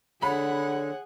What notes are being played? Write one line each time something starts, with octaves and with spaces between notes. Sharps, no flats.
D3 G#4 C#5 F#5 B5